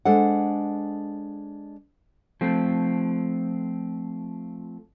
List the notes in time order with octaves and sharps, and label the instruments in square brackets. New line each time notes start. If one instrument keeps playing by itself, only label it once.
[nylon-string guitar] G#3 D4 A4 C5 F#5
[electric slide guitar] F3 A3 C4